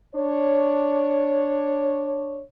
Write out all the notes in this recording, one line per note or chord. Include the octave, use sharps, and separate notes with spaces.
D4 C#5